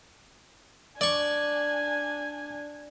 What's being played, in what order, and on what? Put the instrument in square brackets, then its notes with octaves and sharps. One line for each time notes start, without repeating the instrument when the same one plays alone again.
[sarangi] D4 [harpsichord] D5 C#6 [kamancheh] G#5